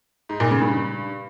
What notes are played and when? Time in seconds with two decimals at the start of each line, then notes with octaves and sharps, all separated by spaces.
0.29 G#2
0.40 A#2
0.51 C#3
0.62 G2